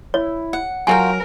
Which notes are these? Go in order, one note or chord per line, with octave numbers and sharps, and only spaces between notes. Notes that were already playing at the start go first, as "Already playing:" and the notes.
E4 C#5
F#5
F#3 F4 F#4 A#4 G5 G#5